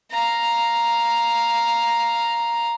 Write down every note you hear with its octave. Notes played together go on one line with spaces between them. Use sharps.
F5 A#5